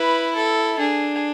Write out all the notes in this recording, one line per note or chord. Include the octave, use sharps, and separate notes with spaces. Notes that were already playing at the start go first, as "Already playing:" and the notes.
Already playing: E4 B4
A4
D4 G#4